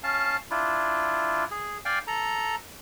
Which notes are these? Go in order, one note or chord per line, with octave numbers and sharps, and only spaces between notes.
C#4 F5 A5
D4 E4 F4
G#4
D5 F5 G5 G#5
A4 A#5